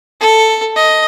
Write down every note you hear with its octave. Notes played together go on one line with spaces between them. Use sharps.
A4
D#5